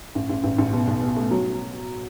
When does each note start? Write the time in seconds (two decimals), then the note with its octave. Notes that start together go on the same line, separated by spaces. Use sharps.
0.15 A1
0.29 A1
0.44 A1
0.58 A1
0.73 B2
0.87 B1
1.02 B2
1.16 A3
1.31 F#3